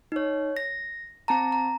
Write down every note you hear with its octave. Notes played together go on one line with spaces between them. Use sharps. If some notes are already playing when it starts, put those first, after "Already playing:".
D#4 C#5
A#6
C4 A5 A#5
A#5